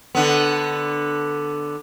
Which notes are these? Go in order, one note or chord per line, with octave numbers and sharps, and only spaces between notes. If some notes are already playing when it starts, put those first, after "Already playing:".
D3 B3